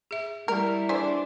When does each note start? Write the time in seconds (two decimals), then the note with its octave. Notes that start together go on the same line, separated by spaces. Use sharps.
0.11 G#4 E5
0.48 G3 E4 A#4
0.89 E3 D4 G#4 C5 D5